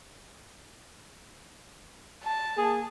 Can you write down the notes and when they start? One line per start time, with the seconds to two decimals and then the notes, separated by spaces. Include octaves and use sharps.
2.23 A5
2.55 A#3 G#4